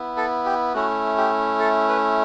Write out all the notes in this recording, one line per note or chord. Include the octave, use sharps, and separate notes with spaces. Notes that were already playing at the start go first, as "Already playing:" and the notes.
Already playing: B3 E4
A4
G4
A3 C#4 E4 F#4
G4
A4
B4